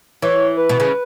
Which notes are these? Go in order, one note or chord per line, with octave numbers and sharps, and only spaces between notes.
E3 C#5
B4
B2
C#3